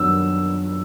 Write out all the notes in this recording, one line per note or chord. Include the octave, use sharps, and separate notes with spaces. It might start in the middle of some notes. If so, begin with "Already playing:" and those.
Already playing: F#2 D#3 G3 B3 D4 E6